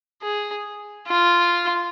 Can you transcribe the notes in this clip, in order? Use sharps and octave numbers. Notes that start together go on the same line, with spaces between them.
G#4
F4